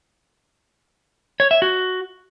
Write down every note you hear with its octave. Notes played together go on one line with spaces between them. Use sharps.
C#5
E5
F#4